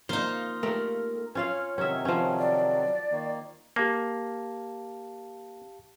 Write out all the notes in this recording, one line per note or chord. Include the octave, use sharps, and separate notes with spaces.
A#3 D#4 F4 C5
A3 G4 A#4
C#4 F4 C#5 F5
C3 D#3 F#3 C#4 E5
F3 C#4
D5
D#3 A#3
A#3 G4 F5 A5